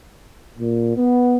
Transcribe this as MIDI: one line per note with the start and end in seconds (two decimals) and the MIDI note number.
0.58 0.94 46
0.97 1.38 59